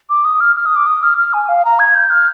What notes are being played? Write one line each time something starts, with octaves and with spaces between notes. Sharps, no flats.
D6
D#6
F6
F6
D#6
D6
D#6
F6
F6
G#5
F5
A#5
G#6
G6
F6